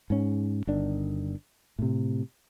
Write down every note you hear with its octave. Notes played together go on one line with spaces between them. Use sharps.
G#2 C#4
G1 D#3 D4
A2 C3